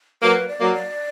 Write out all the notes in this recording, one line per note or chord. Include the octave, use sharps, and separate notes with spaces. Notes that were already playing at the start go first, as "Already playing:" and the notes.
F#3 A#3 B4
D5
F#3 A#3
D5